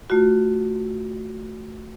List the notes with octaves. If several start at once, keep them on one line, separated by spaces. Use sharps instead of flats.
A3 F4 F#4